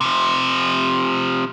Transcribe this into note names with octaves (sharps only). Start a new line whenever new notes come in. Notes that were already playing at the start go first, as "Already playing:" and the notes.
C3 F3